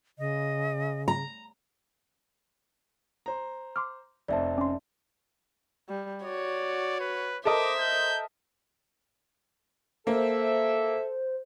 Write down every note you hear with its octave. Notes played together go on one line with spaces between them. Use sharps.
C#3 D#5
A#5
C5 A#5
C6 D6 F6
F1 F2 C5 D5 E5 A5
C#4 C6
G3
F#4 C#5 D5
B4
A4 A#4 C5 D#5 E5 D6
G6
A#3 A4 C5 E5